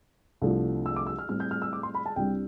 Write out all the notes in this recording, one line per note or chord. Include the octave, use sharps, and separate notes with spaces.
C2 C3 F3 A3 D4
E6
D6
E6
F6
A2 G3 C4 F6
G6
F6
E6
D6
C6
B5
A5
C2 C3 G3 D4 G5